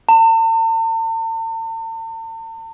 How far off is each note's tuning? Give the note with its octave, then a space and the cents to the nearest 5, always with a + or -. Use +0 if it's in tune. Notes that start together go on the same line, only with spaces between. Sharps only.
A5 +45